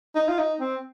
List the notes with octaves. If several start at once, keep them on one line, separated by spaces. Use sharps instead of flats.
D#4
F4
D#4
C4